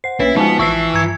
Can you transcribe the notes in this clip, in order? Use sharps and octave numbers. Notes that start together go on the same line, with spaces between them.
C5 F#5 C7
B1 A#3 C#4 E4 B4
F3 G#3 B3 D#4 F#4 G#5
A1 E3 E4 C#6 E6 C7
G2 A#5 E6 G#6 C#7